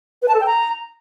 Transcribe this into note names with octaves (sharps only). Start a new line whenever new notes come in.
B4
A5
A4
G5
A#5